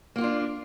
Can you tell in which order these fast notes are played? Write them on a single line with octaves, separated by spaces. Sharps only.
A#3 F#4 F4 D4